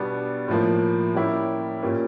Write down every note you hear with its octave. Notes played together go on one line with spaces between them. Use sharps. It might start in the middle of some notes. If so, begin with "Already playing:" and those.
Already playing: B2 G3 B3 D4
A2 F3 A#3
G3 A#3 C#4 E4 G4
A#2 G3 A#3 C#4